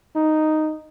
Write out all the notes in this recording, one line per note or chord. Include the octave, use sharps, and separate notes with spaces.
D#4